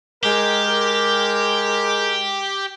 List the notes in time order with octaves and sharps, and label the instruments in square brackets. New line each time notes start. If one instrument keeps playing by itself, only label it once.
[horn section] G#3 A#4 [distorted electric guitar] G4